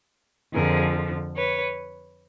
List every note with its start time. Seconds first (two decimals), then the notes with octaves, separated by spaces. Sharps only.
0.53 F2 D3 F3 G#4 A#4
1.36 B4 C#5